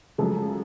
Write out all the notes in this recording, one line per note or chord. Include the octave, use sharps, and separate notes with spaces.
F#2 C#3 F3 G#3 A4